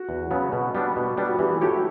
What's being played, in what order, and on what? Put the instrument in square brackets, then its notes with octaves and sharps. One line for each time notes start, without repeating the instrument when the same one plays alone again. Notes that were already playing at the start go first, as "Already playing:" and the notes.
Already playing: [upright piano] F#4
[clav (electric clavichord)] E2
C#3 F#3 B3
B2
G3 B3 D4
B2
G3 B3 D4
[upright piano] F#4
[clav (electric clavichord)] E3 [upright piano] G4
[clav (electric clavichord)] A3 E4 G4 C#5 [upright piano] F#4